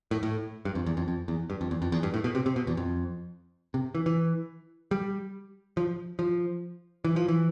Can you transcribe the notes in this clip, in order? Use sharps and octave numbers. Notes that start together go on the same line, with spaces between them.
A2
A2
G2
F2
E2
F2
F2
E2
G2
F2
E2
F2
E2
G2
A2
B2
C3
C3
B2
E2
F2
C3
E3
E3
G3
F3
F3
E3
F3
E3